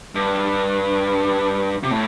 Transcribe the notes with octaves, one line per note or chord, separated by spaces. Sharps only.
G2
C3
A2